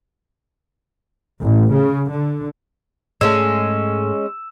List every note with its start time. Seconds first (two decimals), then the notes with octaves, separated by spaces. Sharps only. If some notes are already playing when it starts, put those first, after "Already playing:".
1.42 A1
1.73 C#3
2.11 D3
3.21 G#2 G#3 A3 C#4 E6 E7